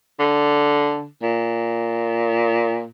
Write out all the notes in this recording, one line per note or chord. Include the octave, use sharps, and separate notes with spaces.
D3
A#2